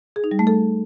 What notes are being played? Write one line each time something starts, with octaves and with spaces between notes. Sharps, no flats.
G#4
D#4
G3
A3
A4